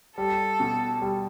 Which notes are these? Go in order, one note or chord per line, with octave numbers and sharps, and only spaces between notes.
G3 A4
B2
G3